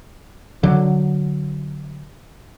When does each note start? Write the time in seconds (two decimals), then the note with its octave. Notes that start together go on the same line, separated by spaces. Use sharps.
0.63 D3 F#3